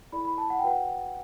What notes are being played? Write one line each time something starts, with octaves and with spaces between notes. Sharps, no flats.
E4 A4 D5 B5
B5
A5
F#5
G5
F#4 B4 D5 F#5